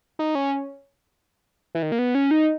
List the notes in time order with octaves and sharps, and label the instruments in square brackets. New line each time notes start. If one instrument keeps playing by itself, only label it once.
[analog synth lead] D#4
C#4
E3
D#3
A#3
B3
C#4
D#4